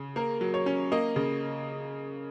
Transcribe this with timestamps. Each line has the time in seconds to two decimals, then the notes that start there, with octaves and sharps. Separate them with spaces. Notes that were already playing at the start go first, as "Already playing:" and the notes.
Already playing: C#3
0.16 A#3 A#4
0.41 F#3
0.54 C#5
0.66 C#4
0.92 A#3 D#5
1.16 C#3